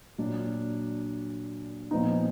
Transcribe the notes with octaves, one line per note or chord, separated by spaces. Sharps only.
A#2 F#3 D4
A#2 F3 B3 D#4